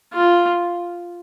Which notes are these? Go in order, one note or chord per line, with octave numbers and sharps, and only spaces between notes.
F4